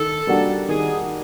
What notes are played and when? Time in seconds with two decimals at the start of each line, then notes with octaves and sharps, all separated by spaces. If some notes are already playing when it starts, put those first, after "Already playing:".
Already playing: D#3 A4
0.27 G3 A#3 D4 F#4
0.68 D#3 G#4